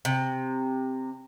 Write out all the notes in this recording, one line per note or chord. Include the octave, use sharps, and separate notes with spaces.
C3